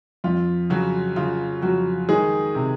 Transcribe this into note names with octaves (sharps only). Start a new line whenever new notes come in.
F2 F4
C#3 F#3 F#4
C#3 F4
F2 F#3 F#4
D#3 G#3 G#4
C3